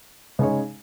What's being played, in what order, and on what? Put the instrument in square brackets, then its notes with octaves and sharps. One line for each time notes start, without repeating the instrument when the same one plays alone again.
[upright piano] C#3 G#3 D#4 G#4 C#5